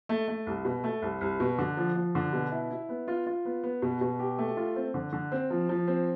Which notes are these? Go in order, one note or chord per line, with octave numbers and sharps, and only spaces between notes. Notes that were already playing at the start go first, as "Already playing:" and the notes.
A3
A3
C2
B2
A3
C2
C2
B2
D3
F3
F3
D3
B2
E4
E4
B3
F4
F4
B3
B3
B2
B2
G4
A3
F4
C4
D3
D3
C4
F3
F3
C4